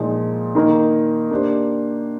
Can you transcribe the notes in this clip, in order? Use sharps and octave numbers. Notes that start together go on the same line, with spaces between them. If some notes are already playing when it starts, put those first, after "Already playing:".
Already playing: A#2 F3 G#3 D#4
D#3 A#3 D#4 A#4
A#3 D4 G4 C5